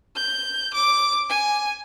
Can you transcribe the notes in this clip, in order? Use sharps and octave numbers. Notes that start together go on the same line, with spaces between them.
G6
D6
G#5